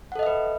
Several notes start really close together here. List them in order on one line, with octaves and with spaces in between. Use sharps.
F#5 A4 D#5 E5 B4